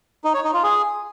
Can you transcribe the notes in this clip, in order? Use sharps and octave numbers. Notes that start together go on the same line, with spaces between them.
D#4
C#5
D#4
F4
G#4